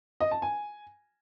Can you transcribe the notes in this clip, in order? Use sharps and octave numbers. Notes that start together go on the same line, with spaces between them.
D#5
A5
G#5